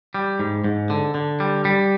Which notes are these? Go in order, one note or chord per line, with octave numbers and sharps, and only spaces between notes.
G3
G#2
G#2
D3
D3
G3
G3